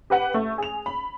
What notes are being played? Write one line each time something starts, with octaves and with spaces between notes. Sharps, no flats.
G4 B4 F#5
A3
G#4 F7
B5